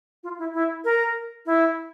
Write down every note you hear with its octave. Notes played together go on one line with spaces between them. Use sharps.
F4
E4
E4
A#4
E4